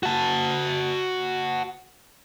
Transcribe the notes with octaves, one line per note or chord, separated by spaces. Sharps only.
F#4 A5